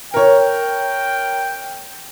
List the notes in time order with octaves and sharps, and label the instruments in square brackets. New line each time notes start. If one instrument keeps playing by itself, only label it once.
[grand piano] A#4 C#5 [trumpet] G5